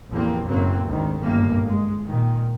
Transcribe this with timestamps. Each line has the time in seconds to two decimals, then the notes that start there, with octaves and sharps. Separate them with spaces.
0.11 A1 E2 F3 A#3 C4
0.47 F#1 F#2 A2 F#3 A#3 C4
0.84 G#1 D2 G#2 D#3
1.21 G1 F#2 A2 A#3
1.66 G#3
2.06 A#2 D#3